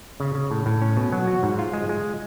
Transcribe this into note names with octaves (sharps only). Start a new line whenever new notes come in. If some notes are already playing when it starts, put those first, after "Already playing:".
C#3
C#3
A2
A2
C#4
B2
F#3
F#4
G#2
F4
G#3
G#3